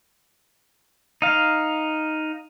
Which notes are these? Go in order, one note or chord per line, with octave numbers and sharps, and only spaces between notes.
D#4 F5